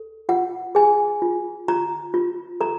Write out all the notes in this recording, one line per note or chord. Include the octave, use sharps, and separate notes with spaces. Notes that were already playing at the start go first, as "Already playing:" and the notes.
Already playing: A4
F4 F#5
G#4 G#5
F4
F4 A#5
F4
A4 A#5